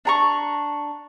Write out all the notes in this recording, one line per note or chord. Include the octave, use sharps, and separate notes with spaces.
D4 A#5 C#6